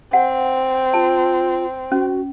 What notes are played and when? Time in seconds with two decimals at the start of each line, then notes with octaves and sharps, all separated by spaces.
0.13 C4 F#5
0.94 F4 A5
1.92 C#4 F#4